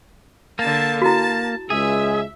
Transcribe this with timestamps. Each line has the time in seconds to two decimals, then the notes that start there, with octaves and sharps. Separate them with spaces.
0.59 D3 A#3 A5
1.02 E4 F#4 A5
1.70 C#2 G#3 G#4 E5